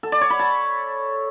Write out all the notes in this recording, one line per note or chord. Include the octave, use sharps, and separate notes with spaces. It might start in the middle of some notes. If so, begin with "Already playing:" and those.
A4
D5
C#5
B5
A5